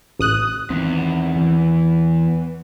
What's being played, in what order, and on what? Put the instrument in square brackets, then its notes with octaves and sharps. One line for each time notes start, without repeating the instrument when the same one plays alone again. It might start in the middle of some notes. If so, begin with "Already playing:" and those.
[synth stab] A1 D#6 F#6
[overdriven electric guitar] E2 [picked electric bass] D#3 C4
[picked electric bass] E3